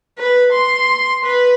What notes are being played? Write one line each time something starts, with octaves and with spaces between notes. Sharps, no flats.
B4
C6
B4